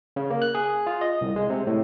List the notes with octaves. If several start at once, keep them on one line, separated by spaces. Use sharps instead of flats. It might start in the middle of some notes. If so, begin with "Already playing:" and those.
C#3
A#3
F#6
G#4
F4
D#5
C2
G#3
C3
A2